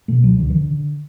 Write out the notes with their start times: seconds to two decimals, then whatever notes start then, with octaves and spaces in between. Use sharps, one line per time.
0.08 B2 A3
0.24 C#2 F#3
0.39 D2 D3
0.50 E3
0.55 D3
0.71 D3